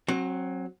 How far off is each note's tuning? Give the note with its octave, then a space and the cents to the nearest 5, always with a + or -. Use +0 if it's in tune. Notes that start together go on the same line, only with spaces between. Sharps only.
F#3 +0 C4 +30